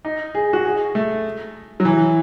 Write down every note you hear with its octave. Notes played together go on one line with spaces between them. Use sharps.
D#4
G#4
F#4
G#4
A3
F#3
E3